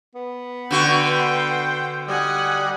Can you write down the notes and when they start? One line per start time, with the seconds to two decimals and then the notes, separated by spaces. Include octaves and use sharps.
0.15 B3
0.71 D3 F#4 C5 G5
2.08 G3 D#5 F#5 G#5